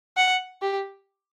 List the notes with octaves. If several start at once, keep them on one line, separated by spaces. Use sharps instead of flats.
F#5
G4